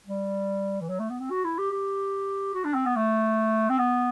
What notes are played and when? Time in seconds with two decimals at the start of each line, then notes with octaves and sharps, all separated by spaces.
0.06 G3
0.81 E3
0.89 F#3
0.99 A3
1.10 B3
1.20 C4
1.31 F#4
1.45 E4
1.58 G4
1.71 G4
2.54 F#4
2.64 D4
2.75 C4
2.86 B3
2.96 A3
3.70 C4
3.78 B3